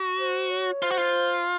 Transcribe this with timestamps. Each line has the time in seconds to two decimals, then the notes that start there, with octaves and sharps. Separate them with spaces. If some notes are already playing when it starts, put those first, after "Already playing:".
Already playing: F#4
0.18 C5
0.50 C#5
0.82 F4 C5
0.91 F#4
0.98 F4